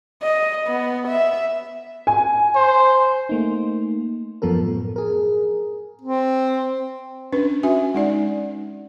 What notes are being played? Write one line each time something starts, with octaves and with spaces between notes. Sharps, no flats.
D#5
B3
E5
G#5
C5
A3 A#3 D#4
F#2 F3 B3 A4 A#4
A2
G#4 A#4
C4
C#4 D4 B4
C#4 F#4 E5 G#5
G#3 D#4 D5